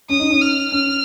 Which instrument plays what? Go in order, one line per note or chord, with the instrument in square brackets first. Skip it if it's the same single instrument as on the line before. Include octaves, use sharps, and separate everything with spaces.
[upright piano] C#4 [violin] D#6
[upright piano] D#4
C#4
[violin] F6
[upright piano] C#4 [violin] F6